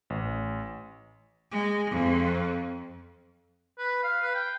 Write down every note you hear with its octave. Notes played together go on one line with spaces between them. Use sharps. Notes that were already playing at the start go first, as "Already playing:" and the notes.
A1
G#3
F2
B4
F5
B4
G5